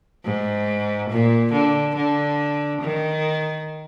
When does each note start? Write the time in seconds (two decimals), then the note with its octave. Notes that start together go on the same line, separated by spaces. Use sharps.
0.25 G#2
1.10 A#2
1.53 D3
1.96 D3
2.81 D#3